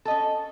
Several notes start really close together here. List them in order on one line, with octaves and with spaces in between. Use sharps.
A4 D#5 C#4